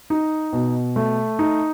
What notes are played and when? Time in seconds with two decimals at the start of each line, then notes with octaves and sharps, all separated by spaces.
0.10 D#4
0.53 B2
0.96 A3
1.39 D#4